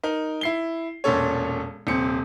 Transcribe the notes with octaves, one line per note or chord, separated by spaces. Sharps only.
D#4 A#4
E4 C7 G7
E1 A#2 C#4 A4 C#5
D#1 C3 C4 C#7